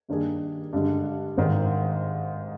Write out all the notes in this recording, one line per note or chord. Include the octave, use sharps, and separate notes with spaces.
G2 D#3 A#3 D4 G#4
G2 D3 G#3
G#1 G#2 D#3 G#3 D#4